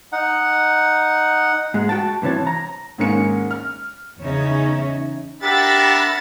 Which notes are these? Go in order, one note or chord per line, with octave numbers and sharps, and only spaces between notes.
D#4 F#5
G#2 G#3
F#4 G5 A5
G2 C3 E3 C#5 A5
A#5
G#2 D#3 G#3 A#3 C#4 C#7
F6
E2 C#3 C#4 D#4 C#5 E5
D4 G4 A#4 E5 F#5 B5 A6